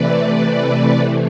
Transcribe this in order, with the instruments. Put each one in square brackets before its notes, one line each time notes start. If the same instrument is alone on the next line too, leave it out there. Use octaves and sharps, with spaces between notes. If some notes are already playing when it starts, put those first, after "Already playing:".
Already playing: [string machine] C3 E3 A3 B4 D5